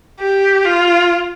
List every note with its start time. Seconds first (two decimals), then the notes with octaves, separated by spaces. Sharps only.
0.20 G4
0.65 F4